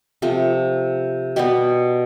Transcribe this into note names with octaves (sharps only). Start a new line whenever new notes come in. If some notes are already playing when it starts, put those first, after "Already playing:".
C3 F3 A3
B2 G3 B3 G4